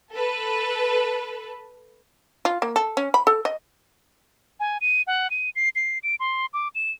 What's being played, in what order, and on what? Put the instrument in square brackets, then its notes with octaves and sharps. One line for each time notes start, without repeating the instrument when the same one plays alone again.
[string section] A4 B4
[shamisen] F4
A#3
A4
C#4
B5
A4
D#5
[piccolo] G#5
D#7
F#5
D#7
C7
C7
D7
C6
D6
E7